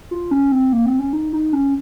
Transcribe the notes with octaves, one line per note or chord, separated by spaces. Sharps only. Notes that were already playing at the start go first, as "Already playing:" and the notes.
F4
C#4
C4
A#3
C4
C#4
D#4
D#4
C#4